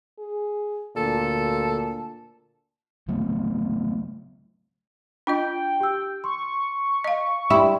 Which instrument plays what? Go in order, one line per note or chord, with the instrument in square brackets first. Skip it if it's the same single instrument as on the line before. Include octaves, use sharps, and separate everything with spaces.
[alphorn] G#4
[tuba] D2 [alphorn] A#2 [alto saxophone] A4 [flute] A5
[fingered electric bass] C#3 F#3 A3 B3
[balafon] D4 F4 D#5 [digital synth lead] G5
[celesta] G4 E6
[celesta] C6 [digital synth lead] C#6
[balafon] D#5 F5
[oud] E4 [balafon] G4 [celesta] G5 C6